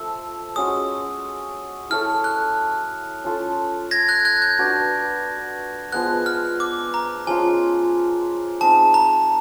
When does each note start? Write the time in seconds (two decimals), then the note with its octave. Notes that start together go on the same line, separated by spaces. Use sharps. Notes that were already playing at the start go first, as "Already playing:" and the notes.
Already playing: F3 A3 E6
0.56 G#3 C#4 F#4 D#6
1.90 E4 A4 C#5 F6
2.24 F#6
3.24 C#4 F4 A4
3.91 G#6 A#6
4.08 F#6 G#6
4.25 F#6 G#6
4.42 G6
4.59 D4 F#4 B4 D5
5.92 F3 G#3 B3 F#6
6.26 F6
6.60 D6
6.94 A#5
7.27 F3 G#3 C#4 F4 G#5
8.61 C4 D#4 G#4 A5
8.94 A#5